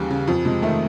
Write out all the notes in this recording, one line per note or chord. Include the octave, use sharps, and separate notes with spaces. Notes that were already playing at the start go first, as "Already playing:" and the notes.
Already playing: D#2 C#3 E3 G3
C#3
F2 F3
C3 G#3
D#3 A3